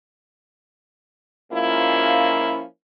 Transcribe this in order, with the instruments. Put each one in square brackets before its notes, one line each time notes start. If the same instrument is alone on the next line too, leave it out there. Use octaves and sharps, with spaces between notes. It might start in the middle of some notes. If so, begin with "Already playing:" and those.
[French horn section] G#2 F3 A#3 C#4 E4 F4